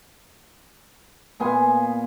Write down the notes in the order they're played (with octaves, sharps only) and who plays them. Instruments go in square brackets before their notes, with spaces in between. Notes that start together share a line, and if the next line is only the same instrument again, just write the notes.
[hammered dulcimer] A#2 B3 G#5 C6